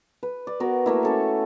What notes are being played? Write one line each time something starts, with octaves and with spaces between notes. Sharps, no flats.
B4
D5
B3 F#4 A#4
A3 A#3 E4
C#4 A4 C#5